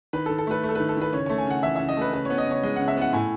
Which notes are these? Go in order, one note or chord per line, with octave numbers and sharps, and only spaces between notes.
D#3 B4
A4
D#3
A4
A3 B4
A3
A4
D#3 B4
A4
D#3 B4
C#3 C#5
A3 C#5
G#5
C#3 F#5
E3 E5
C#3 E5
D#5
A3 B4
C#3 B4
B3 C#5
D#5
C#3 C#5
G#3 D#5
C#3 F#5
E5
B3 F#5
A2 G#5